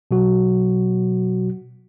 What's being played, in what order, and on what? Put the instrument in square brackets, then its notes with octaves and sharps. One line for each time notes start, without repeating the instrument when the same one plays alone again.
[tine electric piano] B2 F#3 F#4